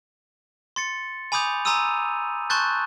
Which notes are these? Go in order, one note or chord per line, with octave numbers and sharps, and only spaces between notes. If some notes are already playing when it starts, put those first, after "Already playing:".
C6 A6 C#7
G#5 B5 D6 D#6 G6 F7
G#5 A#5 C6 D#6 E6 D#7
A5 C6 C#6 F#6 G6 A6